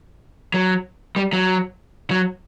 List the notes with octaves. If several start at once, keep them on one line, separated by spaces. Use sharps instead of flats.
F#3
G3
F#3
F#3